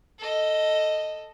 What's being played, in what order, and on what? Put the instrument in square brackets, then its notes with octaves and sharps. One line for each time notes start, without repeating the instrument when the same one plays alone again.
[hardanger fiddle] A4 D#5